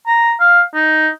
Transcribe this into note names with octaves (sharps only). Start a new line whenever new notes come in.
A#5
F5
D#4